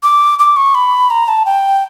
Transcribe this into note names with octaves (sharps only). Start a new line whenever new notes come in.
D6
D6
C#6
B5
A#5
A5
G5